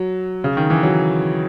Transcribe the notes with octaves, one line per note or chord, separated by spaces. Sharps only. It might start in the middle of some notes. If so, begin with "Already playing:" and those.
Already playing: F#3
C#3
D#3
E3
F#3